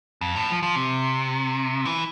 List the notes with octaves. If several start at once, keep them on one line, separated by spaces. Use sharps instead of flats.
F2
A2
F3
F3
C3
E3